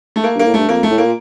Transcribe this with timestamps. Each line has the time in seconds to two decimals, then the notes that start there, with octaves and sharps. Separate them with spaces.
0.16 A3
0.24 A#3
0.35 G2
0.39 A#3
0.46 A2
0.54 G2 A3
0.69 F2 A#3
0.83 A3
0.90 A2
0.98 A#3
1.05 A#2